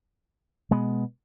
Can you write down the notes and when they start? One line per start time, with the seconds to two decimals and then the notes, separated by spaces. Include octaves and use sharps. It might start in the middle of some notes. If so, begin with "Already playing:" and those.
0.71 B2 G#3 B3